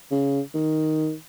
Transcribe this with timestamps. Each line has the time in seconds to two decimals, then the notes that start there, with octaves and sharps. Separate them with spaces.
0.11 C#3
0.54 D#3